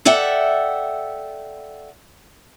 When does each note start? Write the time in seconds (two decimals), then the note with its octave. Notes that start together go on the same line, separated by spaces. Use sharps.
0.05 A4 D5 E5 F#5 G5